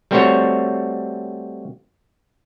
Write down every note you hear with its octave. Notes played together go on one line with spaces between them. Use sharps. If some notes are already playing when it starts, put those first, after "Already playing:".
G3 A3 C4 F#4 C5 C#5